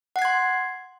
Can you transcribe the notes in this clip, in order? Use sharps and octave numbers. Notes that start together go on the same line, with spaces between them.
F#5 C6 G#6 C7